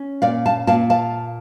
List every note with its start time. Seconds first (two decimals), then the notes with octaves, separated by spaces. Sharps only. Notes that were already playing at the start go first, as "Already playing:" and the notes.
Already playing: C#4
0.22 A#2 D5 F5
0.46 F5 A5
0.67 A#2 F5 A5
0.90 F5 A5